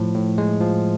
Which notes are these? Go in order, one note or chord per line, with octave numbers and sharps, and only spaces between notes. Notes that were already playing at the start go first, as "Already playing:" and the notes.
Already playing: A2 F3
A2
G#3
F3